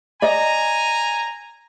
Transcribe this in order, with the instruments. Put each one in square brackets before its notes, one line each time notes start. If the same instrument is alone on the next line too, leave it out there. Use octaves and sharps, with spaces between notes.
[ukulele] D5 D#5 [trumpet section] G#5 A#5